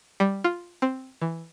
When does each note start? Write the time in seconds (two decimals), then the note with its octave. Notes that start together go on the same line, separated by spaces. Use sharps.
0.20 G3
0.44 F4
0.82 C4
1.21 E3